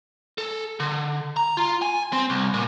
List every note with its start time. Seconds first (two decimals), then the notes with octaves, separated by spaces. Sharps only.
0.38 A4
0.80 D3
1.37 A#5
1.57 F4
1.82 G#5
2.13 C4
2.30 C2
2.54 A#2